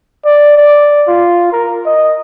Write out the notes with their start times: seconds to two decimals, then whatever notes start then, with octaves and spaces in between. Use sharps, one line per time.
0.25 D5
0.58 D5
1.07 F4
1.52 A#4
1.86 D#5